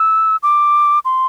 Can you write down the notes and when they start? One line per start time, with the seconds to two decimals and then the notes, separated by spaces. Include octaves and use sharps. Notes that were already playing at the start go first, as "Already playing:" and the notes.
Already playing: E6
0.43 D6
1.05 C6